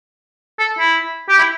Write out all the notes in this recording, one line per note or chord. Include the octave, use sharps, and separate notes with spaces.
A4
E4
G4
E4